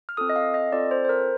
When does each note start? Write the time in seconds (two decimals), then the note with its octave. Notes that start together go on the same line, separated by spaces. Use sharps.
0.09 F6
0.17 C4 F4 A4 D#6
0.30 D#5
0.36 F5
0.54 D#5
0.72 C4 F4 A4 D5
0.91 C5
1.05 C5
1.09 A#4